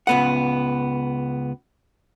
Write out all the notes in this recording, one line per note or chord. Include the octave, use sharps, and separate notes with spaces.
C#2 B3 F#5